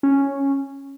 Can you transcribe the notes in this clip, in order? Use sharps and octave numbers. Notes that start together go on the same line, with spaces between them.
C#4